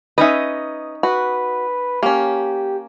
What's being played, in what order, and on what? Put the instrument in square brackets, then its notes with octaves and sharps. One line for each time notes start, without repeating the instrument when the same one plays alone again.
[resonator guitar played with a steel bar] C#4 D#4 D#5 [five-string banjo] B4 E5
[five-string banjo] F#4 [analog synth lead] B4
[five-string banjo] A#3 C#4 [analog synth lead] G4